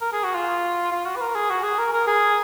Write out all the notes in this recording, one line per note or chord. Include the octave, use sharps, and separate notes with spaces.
A#4
G#4
F#4
F4
F4
F#4
B4
A#4
G#4
F#4
G#4
A#4
A#4
G#4